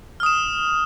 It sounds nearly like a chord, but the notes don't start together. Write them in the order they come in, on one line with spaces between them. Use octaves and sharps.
F6 D#6 E7